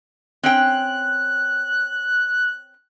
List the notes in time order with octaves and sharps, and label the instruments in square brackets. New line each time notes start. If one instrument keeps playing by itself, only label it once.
[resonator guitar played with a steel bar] C4 C#4 G5 [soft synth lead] F#6